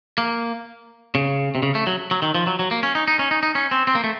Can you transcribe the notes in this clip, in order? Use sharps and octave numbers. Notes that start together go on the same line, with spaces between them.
A#3
C#3
C3
C#3
A3
F#3
F#3
D#3
F3
F#3
F#3
A#3
C#4
D#4
D#4
C#4
D#4
D#4
C#4
C4
C4
A#3
A3